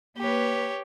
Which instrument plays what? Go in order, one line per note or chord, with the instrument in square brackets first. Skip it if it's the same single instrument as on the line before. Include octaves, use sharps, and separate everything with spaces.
[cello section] A#3 B4 [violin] G4 C#5